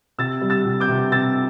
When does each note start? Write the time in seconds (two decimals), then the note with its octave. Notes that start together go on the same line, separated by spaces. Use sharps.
0.18 C3 E6 A6
0.42 G3
0.50 E6 A6
0.65 C3
0.80 D6 G6
0.89 C3
1.12 C3 E6 A6